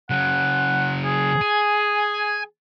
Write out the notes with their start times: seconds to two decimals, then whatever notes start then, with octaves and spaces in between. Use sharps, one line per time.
0.10 C#3 F#3 F#5
1.05 G#4
1.41 G#5